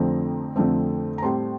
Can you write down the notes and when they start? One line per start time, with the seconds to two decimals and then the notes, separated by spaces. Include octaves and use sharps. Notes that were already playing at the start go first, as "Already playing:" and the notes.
Already playing: F2 D3 F3 A3 C4 A#5
0.56 F2 D3 F3 A3 C4
1.18 A#5
1.22 A2 G3 C4 A5 C6